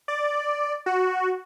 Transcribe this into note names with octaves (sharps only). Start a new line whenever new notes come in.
D5
F#4